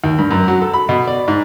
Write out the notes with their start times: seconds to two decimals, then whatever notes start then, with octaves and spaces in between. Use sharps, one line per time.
0.04 D#2
0.19 G2
0.31 F#2
0.48 F#3
0.62 A4
0.74 B5
0.89 B2
1.07 D5
1.28 G#2